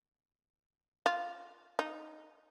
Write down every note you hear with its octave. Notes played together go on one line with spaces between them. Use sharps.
F4
D#4